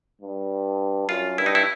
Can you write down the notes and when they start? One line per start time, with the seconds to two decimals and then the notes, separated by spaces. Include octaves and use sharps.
0.22 G2
1.09 F#2 F4
1.38 G2 E4
1.46 D#4
1.55 E4